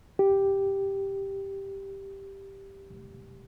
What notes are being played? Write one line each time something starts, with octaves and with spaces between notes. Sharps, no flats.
G4